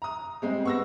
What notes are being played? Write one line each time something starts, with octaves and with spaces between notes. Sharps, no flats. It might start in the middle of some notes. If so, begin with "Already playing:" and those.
A#5 D#6
G3 G#3 C4
B3 C#6 E6 A#6